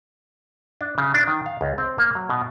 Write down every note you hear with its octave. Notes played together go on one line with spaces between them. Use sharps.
D4
C#3
D4
D#3
F5
C#2
C4
A#3
F#3
B2